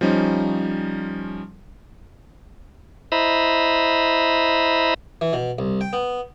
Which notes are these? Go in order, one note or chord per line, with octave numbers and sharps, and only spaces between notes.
F3 G3 C#4 D#4
E4 C5 D#5 E5 A#5 B5
E3
B2
C2
G5
B3